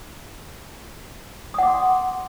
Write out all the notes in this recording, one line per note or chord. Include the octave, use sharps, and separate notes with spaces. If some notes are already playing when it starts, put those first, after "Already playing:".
F#5 C6 D6 D#6